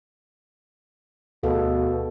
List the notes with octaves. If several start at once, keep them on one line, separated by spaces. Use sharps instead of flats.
D2 B2 G#4 A4 F5